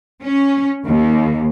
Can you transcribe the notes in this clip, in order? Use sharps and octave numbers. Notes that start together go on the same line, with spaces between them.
C#4
D#2